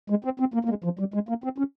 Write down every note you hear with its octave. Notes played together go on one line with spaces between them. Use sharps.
G#3
C4
C4
A#3
A#3
G#3
F3
G3
G#3
A#3
C4
C#4